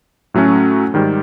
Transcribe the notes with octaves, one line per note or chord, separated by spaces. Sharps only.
A2 F#3 A3 C#4 F#4
G#2 D#3 G3